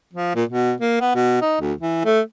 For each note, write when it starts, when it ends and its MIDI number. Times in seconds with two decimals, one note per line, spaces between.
0.14 0.35 53
0.35 0.44 46
0.49 0.73 47
0.81 0.96 58
1.01 1.12 59
1.15 1.40 47
1.42 1.57 63
1.61 1.73 38
1.81 2.04 52
2.05 2.20 57